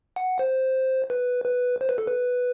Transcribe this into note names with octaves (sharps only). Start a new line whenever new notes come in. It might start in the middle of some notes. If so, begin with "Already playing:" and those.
F#5
C5
B4
B4
C5
B4
A4
B4